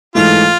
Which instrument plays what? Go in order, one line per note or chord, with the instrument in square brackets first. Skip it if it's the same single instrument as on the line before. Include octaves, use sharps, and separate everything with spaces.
[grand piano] G#2 E3 A3 [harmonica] F4